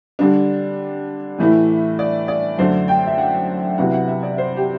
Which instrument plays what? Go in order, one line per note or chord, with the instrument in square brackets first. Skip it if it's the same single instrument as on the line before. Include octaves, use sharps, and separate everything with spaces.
[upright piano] D3 G3 D4
A2 E3 A3 E4
D5
D5
F#2 D3 A3 D4 C5
G5
E5
F#5
C3 F#3 B3 E4 F#5
F#5
E5
D5
C5
G4